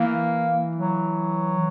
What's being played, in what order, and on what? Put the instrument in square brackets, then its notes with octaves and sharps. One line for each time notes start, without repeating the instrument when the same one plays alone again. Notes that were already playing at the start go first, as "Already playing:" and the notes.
Already playing: [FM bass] E3 [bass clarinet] A#3
[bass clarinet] F#3